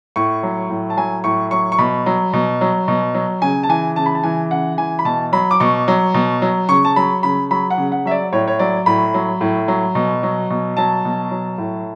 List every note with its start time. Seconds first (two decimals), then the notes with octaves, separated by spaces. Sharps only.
0.16 A2 C#6
0.43 F#3
0.70 A2
0.90 A5
0.97 F#3 G#5
1.24 A2 C#6
1.51 F#3 C#6
1.72 C#6
1.78 B2 B5
2.06 F#3
2.33 B2
2.61 F#3
2.88 B2
3.14 F#3
3.42 C#3 G#5
3.63 A5
3.69 E3 G#5
3.96 C#3 A5
4.06 B5
4.15 A5
4.23 E3 G#5
4.51 C#3 F#5
4.78 E3 G#5
4.99 B5
5.05 B2 A5
5.33 F#3 B5
5.51 D6
5.60 B2 C#6
5.88 F#3
6.14 B2
6.42 F#3
6.69 C#3 C#6
6.85 A5
6.96 F#3 B5
7.23 C#3 B5
7.51 F#3 B5
7.70 F#5
7.78 C#3
7.92 F#5
8.05 F#3 E5
8.11 D5
8.33 A2 C#5
8.48 C#5
8.59 F#3 D5
8.86 A2 B5
9.14 F#3
9.41 A2
9.68 F#3
9.95 B2
10.23 F#3
10.50 B2
10.77 F#3 A5
11.05 B2
11.31 F#3
11.58 A2